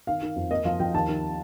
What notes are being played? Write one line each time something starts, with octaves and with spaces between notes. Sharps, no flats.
D#3 F5
D#3
F2
A#3 D#5
F3 F5
F3 G5
D#2 A5
D#3